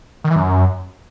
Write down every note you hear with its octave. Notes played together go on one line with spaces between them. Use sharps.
D#3
E3
F#2